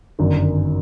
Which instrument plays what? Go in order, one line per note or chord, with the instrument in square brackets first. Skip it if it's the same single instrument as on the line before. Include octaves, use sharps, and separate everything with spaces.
[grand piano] G1 F#2 D#3 F#3